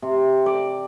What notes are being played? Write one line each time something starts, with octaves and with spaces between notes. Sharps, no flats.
C3
D5